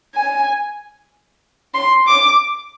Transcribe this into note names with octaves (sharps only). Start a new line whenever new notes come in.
G#5
C6
D6